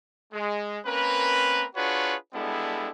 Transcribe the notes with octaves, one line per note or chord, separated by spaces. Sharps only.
G#3
A#3 C4 C#4 A#4 B4
D4 F4 F#4 G#4 B4 C#5
G3 G#3 B3 D4 E4 A4